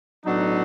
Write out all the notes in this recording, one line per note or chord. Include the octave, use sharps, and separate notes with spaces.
A2 F#3 B3 D4 D#4